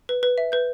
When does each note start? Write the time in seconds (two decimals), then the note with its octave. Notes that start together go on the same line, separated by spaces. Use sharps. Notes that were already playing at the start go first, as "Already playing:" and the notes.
0.09 B4
0.23 B4
0.38 E5
0.52 B4 G6